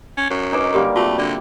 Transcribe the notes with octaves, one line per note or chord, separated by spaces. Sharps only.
C#4
F#2
D4 D#4 B4 D6
D3 G3 A#3 G4 A#4
C3 A3 F4 F#4
D3 D5